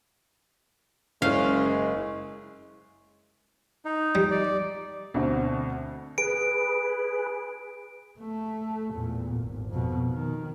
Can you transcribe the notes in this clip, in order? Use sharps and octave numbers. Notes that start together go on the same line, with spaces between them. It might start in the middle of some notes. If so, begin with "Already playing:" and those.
F#1 G#3 C#4 F5
D#4
G3
D5
D2 B2 C4
G#4 B4 D7
A3
E2 A#2
G#1
F2 B2
D#3